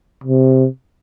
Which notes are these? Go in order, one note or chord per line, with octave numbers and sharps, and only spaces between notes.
C3